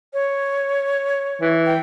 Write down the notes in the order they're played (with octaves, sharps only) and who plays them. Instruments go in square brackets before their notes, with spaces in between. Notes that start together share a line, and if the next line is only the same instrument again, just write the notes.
[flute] C#5
[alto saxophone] E3
[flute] G5